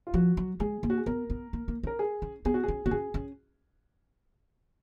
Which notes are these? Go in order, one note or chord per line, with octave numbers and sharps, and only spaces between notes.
F4
F3 F#4
F#3
G#3 G#4
A#3
F#4
G#4
B3 A#4
B3
A#3
A#3
C#4 A#4
G#4
C#4
B3 G#4
F#4
C#4 G#4
B3 F#4
C#4 G#4
C#4